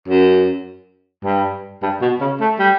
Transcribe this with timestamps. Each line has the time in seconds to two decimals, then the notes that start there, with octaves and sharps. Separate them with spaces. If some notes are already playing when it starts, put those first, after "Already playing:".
0.08 F#2
1.24 G2
1.82 G2
2.01 B2
2.21 C#3
2.40 A3
2.59 G3